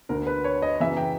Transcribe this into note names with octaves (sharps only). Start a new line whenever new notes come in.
D2 D3 A#4
B4
C#5
D#5
F#2 C#3 E3 E5
G5